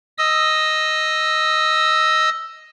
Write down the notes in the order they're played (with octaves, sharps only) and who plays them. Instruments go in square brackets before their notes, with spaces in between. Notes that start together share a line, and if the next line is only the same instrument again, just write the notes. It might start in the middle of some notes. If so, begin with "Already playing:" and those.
[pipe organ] D#5 D#6 E6